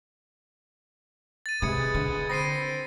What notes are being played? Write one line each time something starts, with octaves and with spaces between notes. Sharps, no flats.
A6 D#7
C3 G#3 B4 D#6 G#6 C#7
D3
C4 G5 B5 A#6 C7 D#7